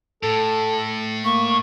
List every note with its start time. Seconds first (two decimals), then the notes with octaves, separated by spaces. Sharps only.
0.23 A2 A4
1.24 A#3 C#6